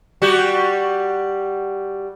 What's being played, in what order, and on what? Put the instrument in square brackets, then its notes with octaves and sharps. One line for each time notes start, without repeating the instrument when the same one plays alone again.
[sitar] G3 F#4 G4